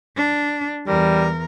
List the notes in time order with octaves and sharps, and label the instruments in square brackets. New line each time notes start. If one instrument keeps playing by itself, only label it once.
[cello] D4
[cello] E2 A#4 [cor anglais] G3